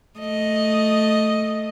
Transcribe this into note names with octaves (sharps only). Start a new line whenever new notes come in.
A3 D#5